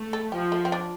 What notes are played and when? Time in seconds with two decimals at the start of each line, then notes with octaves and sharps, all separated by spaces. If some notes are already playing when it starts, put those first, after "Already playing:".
Already playing: A3
0.13 A4
0.32 F3 G4
0.52 A3
0.65 C4
0.72 D4